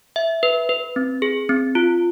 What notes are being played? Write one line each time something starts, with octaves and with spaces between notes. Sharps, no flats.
E5
B4
B4
C4
G#4
C4
F4